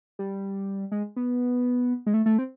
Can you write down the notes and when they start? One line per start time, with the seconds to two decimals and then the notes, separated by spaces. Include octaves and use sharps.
0.19 G3
0.92 G#3
1.16 B3
2.06 G#3
2.14 A3
2.26 A3
2.38 C4